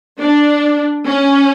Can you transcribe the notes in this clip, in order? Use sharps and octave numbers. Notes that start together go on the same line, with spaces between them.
D4
C#4